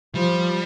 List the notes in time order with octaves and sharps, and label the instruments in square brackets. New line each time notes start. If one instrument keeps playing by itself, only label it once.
[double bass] F3 [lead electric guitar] G3